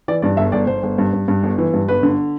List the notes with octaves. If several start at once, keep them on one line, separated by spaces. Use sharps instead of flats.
E3 D5
G2 D5
G1 E5
G1 D5
G1 C5
G1
G2
G2
G2
G1
E3
G2
G1 B4
D3